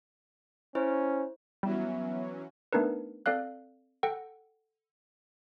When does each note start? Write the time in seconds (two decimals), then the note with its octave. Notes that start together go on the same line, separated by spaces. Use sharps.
0.75 C#4 E4 C5 C#5
1.63 E3 F#3 G3 B3 C#4 E5
2.73 A3 B3 D4 D#4 A#4 B4
3.26 C4 A4 D5 F5 F#6
4.03 A4 F#5 G5